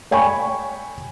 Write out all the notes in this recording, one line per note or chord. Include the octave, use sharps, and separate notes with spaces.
C#5 G5 G#5 B5 C#6